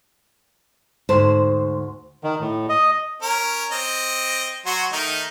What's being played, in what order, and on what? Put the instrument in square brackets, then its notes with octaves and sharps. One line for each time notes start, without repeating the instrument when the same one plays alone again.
[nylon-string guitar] D2 G#2 C5 A5
[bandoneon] D#3
A2
D#5
[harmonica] C#4 A#4
C4 D#5
F#3 F#4 C6
D#3 A3 D#4